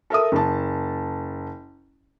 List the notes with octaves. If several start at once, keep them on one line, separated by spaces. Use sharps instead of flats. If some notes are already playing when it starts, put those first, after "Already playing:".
A4 A#4 E5 D#6
F#1 A5